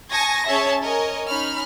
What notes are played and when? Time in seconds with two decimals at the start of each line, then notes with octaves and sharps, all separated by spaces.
0.11 G#5 A5 C#6 D#6 G#6 A#6
0.45 C#4 G#4 C#5 E5 A5
0.81 A#4 C#5 D#5 G#5
1.28 C#4 D#4 B5 F6